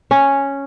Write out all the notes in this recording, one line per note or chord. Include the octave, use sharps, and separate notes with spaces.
C#4